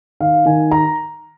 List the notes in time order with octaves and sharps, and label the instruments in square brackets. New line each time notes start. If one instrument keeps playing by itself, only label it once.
[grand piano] D#3 F5
D#3 G#5
A#5